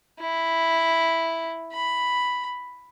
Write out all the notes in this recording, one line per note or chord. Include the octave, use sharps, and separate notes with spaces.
E4
B5